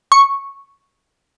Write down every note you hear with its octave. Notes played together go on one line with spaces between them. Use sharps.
C#6